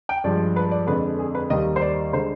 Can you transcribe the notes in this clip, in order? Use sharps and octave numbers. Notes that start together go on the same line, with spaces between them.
G5
G2 F3 G#3 D5
B4
D5
F2 D3 G#3 B4
G#4
B4
D#2 D#3 G3 D#5
C5
D5
D3 G#3 C5